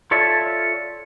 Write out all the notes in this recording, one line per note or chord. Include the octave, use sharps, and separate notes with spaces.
F4 A4 C#5 D5 E5